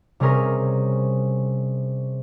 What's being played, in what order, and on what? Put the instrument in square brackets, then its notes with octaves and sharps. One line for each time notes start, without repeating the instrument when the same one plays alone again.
[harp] C3 G3 C#4 G#4 A#4